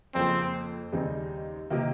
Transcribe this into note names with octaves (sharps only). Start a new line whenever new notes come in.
F2 C#3 F3 A#3 C4
D#2 C#3 G3 C4 D#4
C3 D#3 A#3